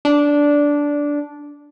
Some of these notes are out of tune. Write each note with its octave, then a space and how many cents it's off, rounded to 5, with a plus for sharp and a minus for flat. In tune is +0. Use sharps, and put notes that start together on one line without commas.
D4 -10